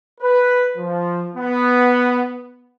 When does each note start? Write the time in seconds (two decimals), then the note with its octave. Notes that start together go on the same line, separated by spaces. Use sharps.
0.21 B4
0.77 F3
1.36 B3